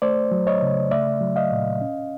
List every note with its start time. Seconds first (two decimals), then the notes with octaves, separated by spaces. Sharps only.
0.02 A3 C5 D5
0.32 F#3
0.47 C#5 D#5
0.62 C#3
0.91 A3 D5 E5
1.21 F#3
1.36 D#5 F5
1.51 A#2
1.81 C#4